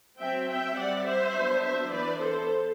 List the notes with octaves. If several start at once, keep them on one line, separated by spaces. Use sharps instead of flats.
F#3 C4 E5 G5
E5 G5
G3 C4 D5 F#5
C5 E5
F#3 B3 D4
C5 E5
E3 B3 D4 B4 D5
A4 C5